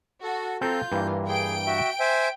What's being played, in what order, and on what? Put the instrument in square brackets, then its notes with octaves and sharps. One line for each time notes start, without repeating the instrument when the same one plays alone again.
[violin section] F#4 [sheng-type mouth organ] A4
[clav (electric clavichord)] C4 A4 A#5 [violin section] F4 [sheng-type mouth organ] G6
[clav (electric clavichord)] G2 E3 A#3
[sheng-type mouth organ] G#4 [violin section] G5 D7
[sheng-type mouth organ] F#4 E5
C5 E5 G#5